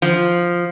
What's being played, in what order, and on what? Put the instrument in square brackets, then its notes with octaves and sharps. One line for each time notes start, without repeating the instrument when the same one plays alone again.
[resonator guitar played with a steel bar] F3